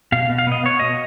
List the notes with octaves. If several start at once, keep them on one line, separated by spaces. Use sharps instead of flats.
B2 F5
B2
F5
B3 D#5
B3 C#5
B2 D#5